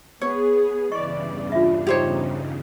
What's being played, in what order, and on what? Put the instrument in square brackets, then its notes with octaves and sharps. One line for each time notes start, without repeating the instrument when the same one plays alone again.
[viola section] B3 G#4 [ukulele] C#5
[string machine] E2 G2 C#3 [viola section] E3 D5 [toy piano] D#5 C#6
[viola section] G3 D4 [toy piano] F4 E5
[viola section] D#4 [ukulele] G4 C5 C#5